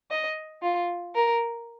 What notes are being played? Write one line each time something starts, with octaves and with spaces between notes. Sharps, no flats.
D#5
F4
A#4